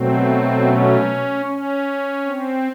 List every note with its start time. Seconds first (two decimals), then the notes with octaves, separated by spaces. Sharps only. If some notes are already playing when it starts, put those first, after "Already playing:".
Already playing: B2 F#3 A3 C4
0.64 C#4
1.46 C#4
2.26 C4